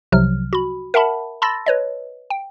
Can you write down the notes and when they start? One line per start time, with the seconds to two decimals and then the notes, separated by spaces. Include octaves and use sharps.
0.12 C2 C3 F3 F#3 F6
0.53 F#4 B5
0.94 A#4 E5 F#5 A5 B5
1.42 A5 B5 C6 E6 A6 A#6
1.66 B4 C#5 D#5
2.30 G5